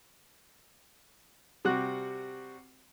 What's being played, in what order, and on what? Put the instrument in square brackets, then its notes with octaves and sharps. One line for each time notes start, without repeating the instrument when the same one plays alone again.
[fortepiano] C3 G3 F#4 F#6